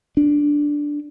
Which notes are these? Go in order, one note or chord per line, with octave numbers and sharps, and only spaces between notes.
D4